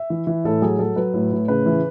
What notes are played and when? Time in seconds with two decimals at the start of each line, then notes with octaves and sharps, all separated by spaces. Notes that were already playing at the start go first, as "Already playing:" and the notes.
Already playing: E5
0.10 E3
0.27 E3
0.44 A2 A4
0.62 F#3 G#4
0.79 F#3 A4
0.96 F#3 B4
1.14 A2
1.31 A2
1.48 C#3 B4
1.66 E3